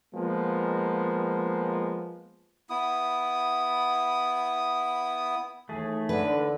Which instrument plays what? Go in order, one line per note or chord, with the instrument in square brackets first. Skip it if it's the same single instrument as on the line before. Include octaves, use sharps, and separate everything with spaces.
[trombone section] F3 G#3 A#3 B3
[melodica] B3 E4 D#6
[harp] D#2 E3 [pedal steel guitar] A3 G#4
[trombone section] D3 [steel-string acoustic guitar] B4